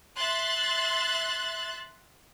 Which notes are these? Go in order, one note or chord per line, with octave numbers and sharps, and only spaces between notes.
E5 C6 F#6 A6